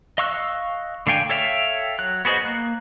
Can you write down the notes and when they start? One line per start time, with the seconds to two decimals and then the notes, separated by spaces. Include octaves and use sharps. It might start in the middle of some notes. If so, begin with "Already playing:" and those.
0.18 D#5 F5 C#6 E6 F#6
1.07 D3 A3 F5 G5 G#5
1.29 A4 C#5 E5 F5 G5
1.99 F#3 F#6
2.25 B3 F#4 G#4 C5 D#5
2.45 A#3 F#6